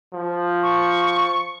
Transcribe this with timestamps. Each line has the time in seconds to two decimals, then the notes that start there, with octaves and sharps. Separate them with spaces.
0.13 F3
0.63 C#6